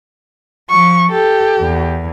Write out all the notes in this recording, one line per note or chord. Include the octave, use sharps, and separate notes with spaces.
F3 C#6
G4 A4
E2